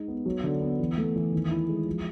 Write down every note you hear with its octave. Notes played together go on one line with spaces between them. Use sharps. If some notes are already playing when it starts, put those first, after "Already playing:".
Already playing: G#3 D#4
B3
F#3
D3
B3
E3
A3
E3
D#3
E4
G#3
F3